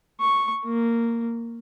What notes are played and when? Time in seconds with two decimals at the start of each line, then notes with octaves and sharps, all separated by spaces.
0.21 C#6
0.65 A#3